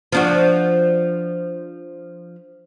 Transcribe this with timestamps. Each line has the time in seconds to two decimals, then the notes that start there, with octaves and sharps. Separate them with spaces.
0.12 F3 D4 F#4